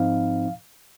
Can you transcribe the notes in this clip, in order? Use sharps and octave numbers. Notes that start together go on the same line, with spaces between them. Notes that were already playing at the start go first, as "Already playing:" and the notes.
Already playing: G#2 F3 C4 D#4 F5